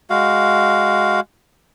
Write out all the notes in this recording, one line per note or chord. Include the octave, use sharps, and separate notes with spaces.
G#3 F#4 F5